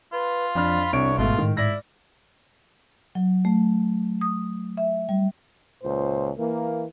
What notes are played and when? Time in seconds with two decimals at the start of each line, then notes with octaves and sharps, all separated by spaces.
0.12 F4 B4
0.55 F2 F3 D4 B5 F6
0.93 C2 C4 D4 C#5 D7
1.18 G#1 G#2 B2 A3 F4
1.38 A2 D#3
1.57 E4 D5 A#6
3.15 F#3
3.45 A3
4.21 D#6
4.77 E5
5.09 G3
5.82 C#2 A#2 C5
6.38 E3 A#3